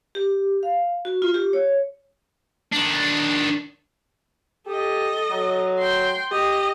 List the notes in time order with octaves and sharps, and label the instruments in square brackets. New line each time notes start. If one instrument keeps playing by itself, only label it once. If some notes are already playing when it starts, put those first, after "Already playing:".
[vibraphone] G4
F5
F#4
F4
G4
C#5
[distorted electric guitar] D#3 D4
[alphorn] G4 [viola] A4 D#5
[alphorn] F#3
[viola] G5 C6
[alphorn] G4 [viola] D#5